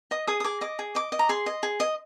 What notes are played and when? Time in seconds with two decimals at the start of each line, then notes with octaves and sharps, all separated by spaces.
0.11 D#5 D#6
0.27 G#4 D#6
0.40 D#6
0.44 G#4 D6
0.61 D#5 D6
0.79 G#4
0.95 D#5 D6
1.12 D#5
1.19 A#5
1.29 G#4 C6
1.46 D#5
1.63 G#4
1.80 D#5